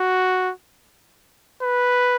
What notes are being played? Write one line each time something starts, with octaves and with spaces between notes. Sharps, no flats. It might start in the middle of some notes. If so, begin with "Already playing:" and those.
Already playing: F#4
B4